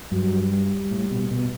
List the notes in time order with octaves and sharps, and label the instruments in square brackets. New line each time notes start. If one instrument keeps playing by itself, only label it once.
[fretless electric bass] G2 [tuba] F#3
[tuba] G3
[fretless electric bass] A2
B2
B2